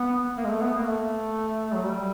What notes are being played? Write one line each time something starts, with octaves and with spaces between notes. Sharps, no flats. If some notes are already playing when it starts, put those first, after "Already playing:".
Already playing: B3
A#3
G#3
A3
B3
A#3
A3
F#3
G3